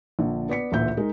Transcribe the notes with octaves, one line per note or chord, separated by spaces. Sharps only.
A#1 D3
B3 D5 B6 C#7
A1 D2 A#2 E5 G6
G#3 D#4 A#4